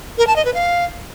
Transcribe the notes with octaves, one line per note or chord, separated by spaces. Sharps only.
A#4
A5
D#5
B4
F5